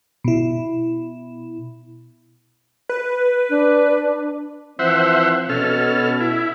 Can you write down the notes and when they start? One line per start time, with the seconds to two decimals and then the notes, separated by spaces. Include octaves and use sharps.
0.24 B2 E4
2.89 B4
3.50 D4
4.79 E3 F3 C4 C5 E5 F#5
5.49 B2 C#4 A4 F6
6.20 E4